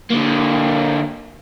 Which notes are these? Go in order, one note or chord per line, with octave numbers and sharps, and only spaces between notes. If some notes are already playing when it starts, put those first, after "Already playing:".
D3 A#3